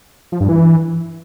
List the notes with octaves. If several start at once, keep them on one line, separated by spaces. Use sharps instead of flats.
F3
G2
E3